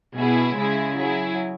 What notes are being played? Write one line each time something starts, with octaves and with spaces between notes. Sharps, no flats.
B2 B3 E4 G#4
C#3 G#3 E4 G#4
F#3 E4 G#4